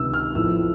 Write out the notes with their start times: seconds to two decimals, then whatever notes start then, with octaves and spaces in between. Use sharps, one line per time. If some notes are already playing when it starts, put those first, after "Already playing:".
Already playing: C#2 C3 D#3 E6
0.14 F6
0.35 A1 A2 F3 E6